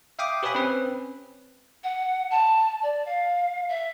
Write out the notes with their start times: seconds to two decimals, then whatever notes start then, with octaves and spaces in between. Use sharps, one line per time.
0.19 E5 F5 G5 D6 D#6
0.43 G4 B4 C#5 G#5 B5 D#6
0.55 C4 C#4 B4
1.84 F#5
2.31 A5
2.83 D5
3.05 F5
3.69 E5